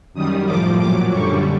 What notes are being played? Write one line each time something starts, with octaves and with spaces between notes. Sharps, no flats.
F#2 D#3 G3 D#6
A2 F3 D6
A#2 F#3 D6
F#2 D3 G3 C#6